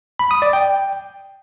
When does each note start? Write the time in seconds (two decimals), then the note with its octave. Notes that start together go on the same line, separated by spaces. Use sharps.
0.19 B5
0.31 D#6
0.42 D5
0.53 G5